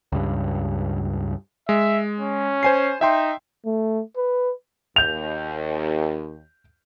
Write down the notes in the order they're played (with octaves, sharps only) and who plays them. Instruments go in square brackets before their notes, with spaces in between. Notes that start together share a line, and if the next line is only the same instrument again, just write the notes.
[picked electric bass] C#2 G2
[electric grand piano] G#3 [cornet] E5
[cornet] C#4
[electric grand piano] C5 G#5 C7
[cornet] D#4 [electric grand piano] E5 G5 C6
[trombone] A3
B4
[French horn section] D#2 [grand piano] G6 F7